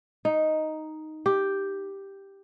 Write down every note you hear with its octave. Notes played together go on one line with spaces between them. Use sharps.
D#4
G4